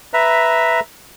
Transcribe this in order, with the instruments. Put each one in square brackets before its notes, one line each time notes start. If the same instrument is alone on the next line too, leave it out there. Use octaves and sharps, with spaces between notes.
[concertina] B4 E5 A#5